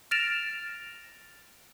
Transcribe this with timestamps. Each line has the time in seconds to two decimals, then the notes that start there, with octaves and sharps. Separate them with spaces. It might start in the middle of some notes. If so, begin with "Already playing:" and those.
0.11 F6 A6 A#6 D7 E7 F7